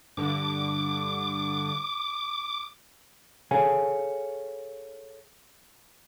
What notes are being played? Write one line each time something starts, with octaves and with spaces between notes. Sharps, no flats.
G2 D3 D6
G#4 A4 C#5 F5 G#5